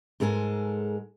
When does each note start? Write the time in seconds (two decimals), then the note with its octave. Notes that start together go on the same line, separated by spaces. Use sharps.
0.20 G#2 G#3 A4 A#4 G#5